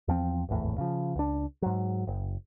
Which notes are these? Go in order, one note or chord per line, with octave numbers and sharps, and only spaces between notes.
E2 F3 C4
D1 G#1 E2 A2
C#3 F3
C#2 D4
G#2 F#3
F#1